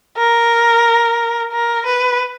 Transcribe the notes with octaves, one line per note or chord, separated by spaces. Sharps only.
A#4
A#4
B4